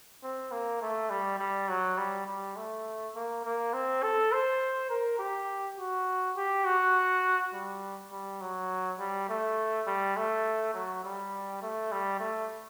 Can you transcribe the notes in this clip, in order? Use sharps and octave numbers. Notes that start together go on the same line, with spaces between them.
C4
A#3
A3
G3
G3
F#3
G3
G3
A3
A#3
A#3
C4
A4
C5
A#4
G4
F#4
G4
F#4
G3
G3
F#3
G3
A3
G3
A3
F#3
G3
A3
G3
A3